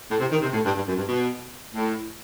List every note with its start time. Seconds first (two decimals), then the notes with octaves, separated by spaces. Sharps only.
0.09 A2
0.20 C3
0.31 D#3
0.42 C3
0.53 A2
0.64 G2
0.76 G2
0.87 F#2
0.97 G2
1.08 B2
1.74 A2